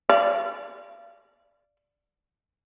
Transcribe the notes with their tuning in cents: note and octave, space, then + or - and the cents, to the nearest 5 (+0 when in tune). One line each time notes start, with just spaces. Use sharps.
D5 +0 F5 -35